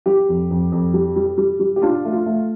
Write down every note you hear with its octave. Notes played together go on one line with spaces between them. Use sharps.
G3 G4
F2
F2
F2
G3
G3
G3
G3
G4
D4 F4
A3
F4
A3